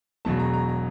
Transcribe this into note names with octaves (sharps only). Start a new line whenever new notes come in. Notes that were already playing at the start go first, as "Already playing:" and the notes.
E1 E2 B2 F#3 A3 A5
A#5
A#5
A#5